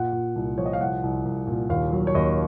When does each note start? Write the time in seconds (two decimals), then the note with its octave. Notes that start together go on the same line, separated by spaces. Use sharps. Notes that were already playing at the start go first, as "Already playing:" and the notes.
Already playing: A#2 F#5
0.13 A#2
0.36 C2
0.58 F3 C#5
0.66 D#5
0.73 F5
0.81 C2 F#5
1.03 C2
1.25 C2
1.47 A#2
1.69 D#2 F5
1.92 F#3
2.07 C#5
2.15 D#2 D#5